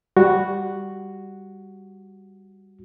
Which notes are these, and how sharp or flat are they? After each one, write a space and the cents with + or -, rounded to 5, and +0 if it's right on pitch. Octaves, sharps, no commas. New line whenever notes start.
G3 +0 F#4 +0